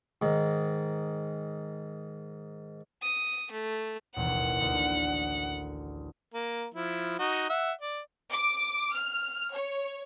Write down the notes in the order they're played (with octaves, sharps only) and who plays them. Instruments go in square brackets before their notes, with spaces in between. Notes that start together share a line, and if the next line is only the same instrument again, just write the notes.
[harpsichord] G#2 D#3
[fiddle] D#6
A3
[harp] E1 A1 D#2 [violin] F#5
[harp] D2
[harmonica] A#3
F3 E4
D#4 F#4
E5 F#5
D5
[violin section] D6
F6
C#5